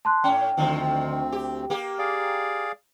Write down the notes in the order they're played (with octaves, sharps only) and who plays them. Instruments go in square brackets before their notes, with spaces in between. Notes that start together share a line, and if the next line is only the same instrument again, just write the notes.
[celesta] A5 C6 F#6
[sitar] A2 C#4 [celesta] G5
[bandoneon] D2 C4 [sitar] D3 D#3 F3
[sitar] G4
A#3 G4
[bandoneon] G#4 D5 F5